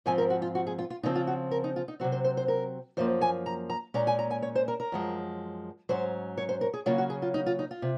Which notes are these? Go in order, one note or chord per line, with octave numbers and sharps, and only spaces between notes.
G#2 F3 C4 G#5
A#4
F#4
F4
F#4
G#4
F4
F4
C#3 F3 C4 D#4
F4
F#4
A#4
D#4
F4
D#4
C3 F#3 C4 F#4
C5
C5
C5
A#4
F#2 F3 A#3 C5
G#5
A#5
A#5
A#2 G#3 C#4 A#5
G#5
A#5
G#5
C#5
C5
A#4
A#4
F#2 F3 G#3
G#2 F#3 C#4 C5
C#5
C5
A#4
G#4
C#3 F#3 A#3 C#4 F4
F#4
G#4
F4
D#4
F4
D#4
F4
C3